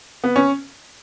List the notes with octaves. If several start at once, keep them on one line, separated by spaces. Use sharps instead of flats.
B3
C#4